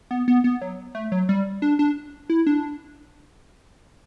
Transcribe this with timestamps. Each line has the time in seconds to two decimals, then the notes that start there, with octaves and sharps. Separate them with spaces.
0.11 B3
0.28 B3
0.44 B3
0.61 F#3
0.95 A3
1.12 F#3
1.29 G3
1.62 D4
1.79 D4
2.30 E4
2.47 D4